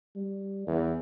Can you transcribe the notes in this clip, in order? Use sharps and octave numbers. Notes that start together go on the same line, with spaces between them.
G3
E2